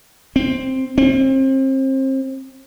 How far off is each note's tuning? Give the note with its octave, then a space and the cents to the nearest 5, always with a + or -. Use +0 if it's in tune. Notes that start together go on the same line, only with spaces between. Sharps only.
C4 +5
C4 +30